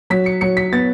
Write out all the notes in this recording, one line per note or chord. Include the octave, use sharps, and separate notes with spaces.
F#3 B6
C#7
F#3 C#7
B6
B3 A6